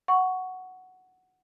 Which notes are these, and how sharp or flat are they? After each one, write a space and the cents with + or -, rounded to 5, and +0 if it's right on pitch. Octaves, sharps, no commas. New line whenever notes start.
F#5 +0 C#6 +10